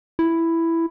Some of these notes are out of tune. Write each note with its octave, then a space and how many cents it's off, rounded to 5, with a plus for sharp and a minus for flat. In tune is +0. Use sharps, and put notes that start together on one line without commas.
E4 +5